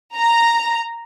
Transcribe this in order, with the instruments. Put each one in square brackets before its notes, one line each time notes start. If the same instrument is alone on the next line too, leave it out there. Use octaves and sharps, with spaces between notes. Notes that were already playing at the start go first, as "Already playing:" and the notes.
[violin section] A#5